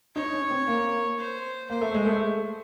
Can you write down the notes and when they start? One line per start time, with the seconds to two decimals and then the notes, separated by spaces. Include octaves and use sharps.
0.15 D#4 C#5
0.33 C#4
0.50 C4
0.67 A#3
1.19 C5
1.70 A#3 C5
1.81 A3
1.94 G#3
2.06 A3